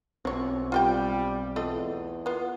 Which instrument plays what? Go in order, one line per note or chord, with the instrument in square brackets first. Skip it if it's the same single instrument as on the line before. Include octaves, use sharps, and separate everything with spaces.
[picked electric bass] B1 C4 [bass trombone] F#2 [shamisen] F3 C#5
[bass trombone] G3 [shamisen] F4 G4 G5
[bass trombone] E2 [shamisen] A3 F4 D#5
[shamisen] B3 F4